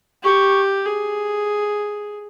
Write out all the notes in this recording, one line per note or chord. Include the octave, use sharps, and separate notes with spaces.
G4 C#6
G#4